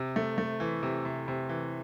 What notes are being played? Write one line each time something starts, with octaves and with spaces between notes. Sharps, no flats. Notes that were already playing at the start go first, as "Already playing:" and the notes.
Already playing: C3
A3
A3
E3
C3
C3
C3
E3